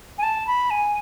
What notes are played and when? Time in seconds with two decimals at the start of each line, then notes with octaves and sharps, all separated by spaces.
0.18 G#5
0.22 A5
0.47 B5
0.70 G#5